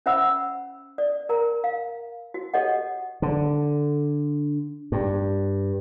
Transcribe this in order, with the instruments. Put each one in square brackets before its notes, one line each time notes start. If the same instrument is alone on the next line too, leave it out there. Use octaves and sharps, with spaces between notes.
[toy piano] C#4 C5 E5 F#5 B5 E6
D5
A#4 A#5
F5
F#4
G4 A4 C#5 D#5 F#5
[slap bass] D3
G2